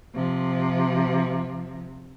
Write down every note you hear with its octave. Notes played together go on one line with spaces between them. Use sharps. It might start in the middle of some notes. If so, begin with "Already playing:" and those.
C3 F3